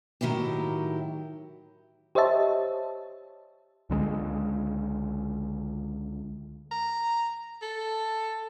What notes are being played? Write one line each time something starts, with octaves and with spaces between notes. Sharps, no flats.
A2 D#3 F#3 E4 G4
G4 C5 C#5 D#5 E5 A5
C#2 D3 F#3 G#3
A#5
A4